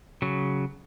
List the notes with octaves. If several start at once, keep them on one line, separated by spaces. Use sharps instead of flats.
C#3 F#3